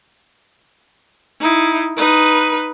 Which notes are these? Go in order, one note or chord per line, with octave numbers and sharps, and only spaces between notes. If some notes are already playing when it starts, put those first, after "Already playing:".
D#4 E4
D#4 B4